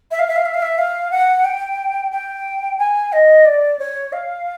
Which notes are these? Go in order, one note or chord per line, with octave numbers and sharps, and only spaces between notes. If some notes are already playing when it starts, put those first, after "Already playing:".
E5
F5
E5
F5
E5
F5
E5
F5
F#5
G5
G5
G#5
D#5
D5
C#5
F5